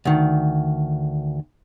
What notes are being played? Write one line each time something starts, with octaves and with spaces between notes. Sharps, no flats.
D2 D#3